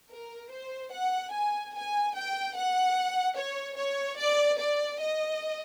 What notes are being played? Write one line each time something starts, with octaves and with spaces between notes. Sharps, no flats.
A#4
C5
F#5
G#5
G#5
G5
F#5
C#5
C#5
D5
D5
D#5